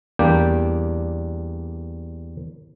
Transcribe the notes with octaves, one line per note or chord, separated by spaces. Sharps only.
E2 G3 A#3 D4 G5